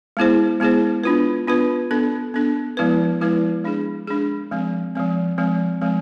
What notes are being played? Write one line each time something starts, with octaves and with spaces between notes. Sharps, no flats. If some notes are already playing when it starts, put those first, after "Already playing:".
G#3 B3 E4 G#4 C5
G#3 B3 E4 G#4 C5
B3 D4 F4 B4
B3 D4 F4 B4
B3 D4 A4
B3 D4 A4
F3 G#3 B3 E4 B4
F3 G#3 B3 E4 B4
G#3 D4 G#4
G#3 D4 G#4
F3 G#3 C4
F3 G#3 C4
F3 G#3 C4
F3 G#3 C4